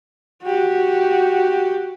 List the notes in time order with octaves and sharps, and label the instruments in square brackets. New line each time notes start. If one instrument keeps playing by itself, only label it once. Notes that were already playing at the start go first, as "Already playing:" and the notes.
[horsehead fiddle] F#4 G4